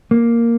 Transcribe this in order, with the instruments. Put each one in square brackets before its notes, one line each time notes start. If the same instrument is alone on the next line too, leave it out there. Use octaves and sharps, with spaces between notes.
[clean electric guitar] A#3